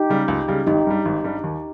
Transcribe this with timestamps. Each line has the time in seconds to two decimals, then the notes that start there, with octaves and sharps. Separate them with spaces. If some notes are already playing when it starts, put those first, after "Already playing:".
Already playing: D#4 G4
0.10 C#3 G3
0.28 C#2
0.48 C#3 G3
0.66 G#1 D#4 G4
0.87 G2 G3
1.05 G#1
1.24 G2 G3
1.44 D#2